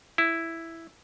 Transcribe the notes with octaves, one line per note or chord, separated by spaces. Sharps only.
E4